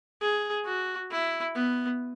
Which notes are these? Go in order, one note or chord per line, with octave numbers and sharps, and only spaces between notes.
G#4
F#4
E4
B3